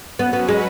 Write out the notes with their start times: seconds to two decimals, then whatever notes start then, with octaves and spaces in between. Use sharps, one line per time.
0.18 F#3 B3 C#4 F#4 B4
0.33 B3
0.49 G#3